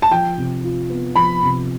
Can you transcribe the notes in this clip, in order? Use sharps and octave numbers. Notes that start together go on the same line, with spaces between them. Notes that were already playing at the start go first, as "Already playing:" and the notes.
A5
F3 G5
C3
F4
B3
F3 B5
C3